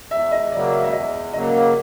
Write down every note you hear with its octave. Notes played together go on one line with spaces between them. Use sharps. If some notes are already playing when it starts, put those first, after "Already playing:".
E2 E5
D#5
C#3 F#3 A#3 D5
E5
E5
E2 D#5
C#3 F#3 A#3 D#5